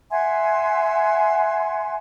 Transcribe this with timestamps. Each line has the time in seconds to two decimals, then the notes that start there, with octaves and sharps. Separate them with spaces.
0.12 E5 F#5 G#5 C6